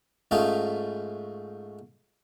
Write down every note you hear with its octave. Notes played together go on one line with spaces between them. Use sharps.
G#2 A3 C#4 D#4 F4